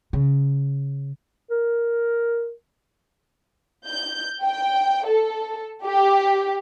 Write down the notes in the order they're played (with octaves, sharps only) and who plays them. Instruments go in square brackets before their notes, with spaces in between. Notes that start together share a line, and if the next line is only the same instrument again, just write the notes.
[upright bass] C#3
[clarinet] A#4
[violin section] G6
G5
A4
G4